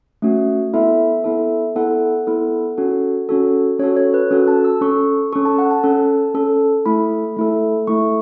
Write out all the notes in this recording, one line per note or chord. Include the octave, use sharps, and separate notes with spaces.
A3 C#4 F#4
B3 E4 A4 E5
B3 E4 A4
B3 E4 A4 F#5
B3 E4 A4
C#4 F#4 A4
C#4 F#4 A4
C#4 F#4 A4 C#5
C#5
B4
C#4 F#4 A4
A5
E6
C#4 A4 C#6
C#4 A4 C#6
A5
F#5
A5
C#4 A4
C#4 A4
A3 E4 A4 B5
A3 E4 A4
A3 E4 A4 C#6